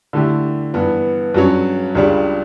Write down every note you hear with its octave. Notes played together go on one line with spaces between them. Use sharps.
D3 A3 E4 G4
G2 E3 B3
G2 F#3 C#4
C#2 C#3 G3 D4